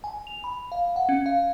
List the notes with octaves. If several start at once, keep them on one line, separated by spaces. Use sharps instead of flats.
G#5
F7
B5
F5
F#5
C#4
F5